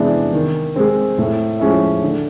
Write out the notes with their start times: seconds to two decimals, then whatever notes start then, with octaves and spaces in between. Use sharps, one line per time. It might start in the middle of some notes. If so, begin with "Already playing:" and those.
Already playing: C3 E3 G#3 B3 D4
0.33 D#3
0.76 G#3 C4
1.18 A2
1.60 F3 G#3 C#4 E4
2.02 D3